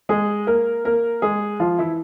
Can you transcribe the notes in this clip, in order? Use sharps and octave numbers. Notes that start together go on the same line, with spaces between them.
G#3 G#4
A#3 A#4
A#3 A#4
G#3 G#4
F3 F4
E3 E4